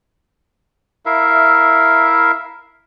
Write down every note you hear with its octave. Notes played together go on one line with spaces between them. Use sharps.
E4 A#4 E5 F5